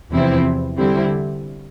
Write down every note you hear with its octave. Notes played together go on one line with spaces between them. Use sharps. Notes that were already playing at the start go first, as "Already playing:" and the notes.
E2 C3 F3 C4 E4
D3 G3 C4 E4